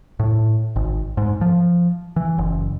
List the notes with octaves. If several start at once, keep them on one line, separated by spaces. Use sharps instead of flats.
A2
G#1
G#2
F3
E3
F#1